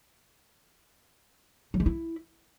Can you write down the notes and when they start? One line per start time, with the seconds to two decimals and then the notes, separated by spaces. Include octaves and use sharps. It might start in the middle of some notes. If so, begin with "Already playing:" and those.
1.74 F#3
1.80 G#3
1.86 E4